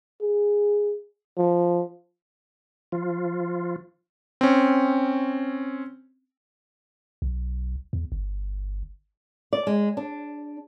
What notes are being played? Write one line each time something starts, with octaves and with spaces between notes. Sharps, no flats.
G#4
F3
F3 F4
C4 C#4
B1
E2
G1
D5
G#3
D4